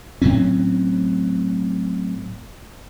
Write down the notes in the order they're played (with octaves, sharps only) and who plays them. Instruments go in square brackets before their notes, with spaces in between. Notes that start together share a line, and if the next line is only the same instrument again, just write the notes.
[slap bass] A2 F#3 C4 C#4